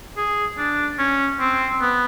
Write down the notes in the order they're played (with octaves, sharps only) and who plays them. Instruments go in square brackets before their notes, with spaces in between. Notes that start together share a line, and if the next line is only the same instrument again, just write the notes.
[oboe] G#4
D4
C#4
C4
B3